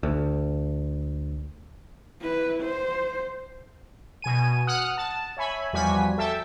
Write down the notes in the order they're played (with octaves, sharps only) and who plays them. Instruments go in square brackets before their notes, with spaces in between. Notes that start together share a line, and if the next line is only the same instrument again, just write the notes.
[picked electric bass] D2
[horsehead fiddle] E4 B4
C5
[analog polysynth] B2 G#5 D#7
F#5 D#6 F6 F#6
A5
C#5 E5 G#5 B5
E2 F3 G3 F#4 G#5 B6
A4 E5 G5 A5